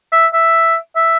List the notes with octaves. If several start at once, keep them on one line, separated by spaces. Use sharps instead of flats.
E5
E5
E5